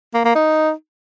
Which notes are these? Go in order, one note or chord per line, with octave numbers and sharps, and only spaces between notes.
A#3
A#3
D#4